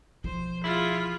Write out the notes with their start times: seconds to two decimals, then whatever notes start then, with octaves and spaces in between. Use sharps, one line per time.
0.24 B1 F3 C5
0.64 E4 F4 G#4